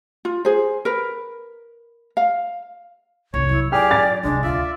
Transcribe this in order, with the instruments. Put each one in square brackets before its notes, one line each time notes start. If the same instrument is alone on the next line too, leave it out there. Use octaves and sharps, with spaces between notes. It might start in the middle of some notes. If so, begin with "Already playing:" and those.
[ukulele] F4
G#4 C5
A#4 B4
F5
[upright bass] C2 F2 [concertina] C#5
[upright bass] F#3 [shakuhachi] E4
[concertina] G4 G#4 F6 [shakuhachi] D5 [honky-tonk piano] G5
[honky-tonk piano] A6
[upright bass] D#1 C2 [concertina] G#3 [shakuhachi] D4
[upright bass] D2 [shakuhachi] F4 [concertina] D5 E5